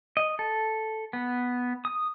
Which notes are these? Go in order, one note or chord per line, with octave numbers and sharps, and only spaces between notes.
D#5
A4
B3
D#6